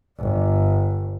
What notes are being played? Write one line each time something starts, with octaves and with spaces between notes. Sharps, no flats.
G1